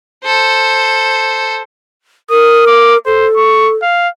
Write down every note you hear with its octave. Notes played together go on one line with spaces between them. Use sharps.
A4 C5
A#4 D#6
D6
A4 C5
C#6
F5